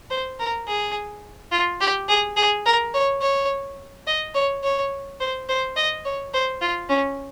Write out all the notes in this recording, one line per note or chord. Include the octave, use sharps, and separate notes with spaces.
C5
A#4
G#4
F4
G4
G#4
G#4
A#4
C#5
C#5
D#5
C#5
C#5
C5
C5
D#5
C#5
C5
F4
C#4